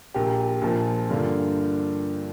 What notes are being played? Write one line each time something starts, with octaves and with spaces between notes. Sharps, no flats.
A#1 A#2 A#3 G4
A#1 A#2 F3
G2 D3 A#3 F4